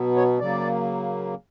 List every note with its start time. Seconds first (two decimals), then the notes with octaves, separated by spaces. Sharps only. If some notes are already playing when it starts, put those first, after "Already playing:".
Already playing: B2 F#3 B3
0.16 C#5
0.39 C#3 F#3 A#3 D5